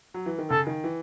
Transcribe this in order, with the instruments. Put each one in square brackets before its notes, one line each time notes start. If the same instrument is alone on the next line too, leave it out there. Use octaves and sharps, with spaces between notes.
[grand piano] F#3
E3
D#3
[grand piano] C#3 [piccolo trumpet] A4
[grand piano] D#3
E3